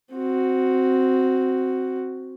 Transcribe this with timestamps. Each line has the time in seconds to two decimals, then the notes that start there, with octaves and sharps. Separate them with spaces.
0.13 C4 F#4